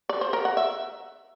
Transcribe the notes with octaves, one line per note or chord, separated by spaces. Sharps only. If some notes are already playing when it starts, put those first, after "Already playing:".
D5
C5
A#4
F#5
E5